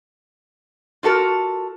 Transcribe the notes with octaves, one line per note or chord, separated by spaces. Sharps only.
F4 F#4 A4 A#4